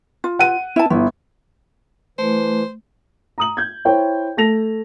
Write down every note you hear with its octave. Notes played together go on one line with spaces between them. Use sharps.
F4
F#5 D#7
E4 A5
G1 E4
E3 A3 C5
A#5 D#6 F#7
G6 G#6
E4 C5 C#5 G5
A3 A5 A#6 F7